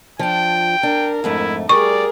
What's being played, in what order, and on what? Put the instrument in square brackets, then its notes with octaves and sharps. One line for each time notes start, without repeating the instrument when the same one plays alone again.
[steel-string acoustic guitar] F3 D4 [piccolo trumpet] G5
[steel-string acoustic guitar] D4 [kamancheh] A#4
[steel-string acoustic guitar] F2 G#2 A3 [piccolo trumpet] E4
[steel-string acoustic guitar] G3 [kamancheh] G#4 A#4 [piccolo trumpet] D5 [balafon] C#6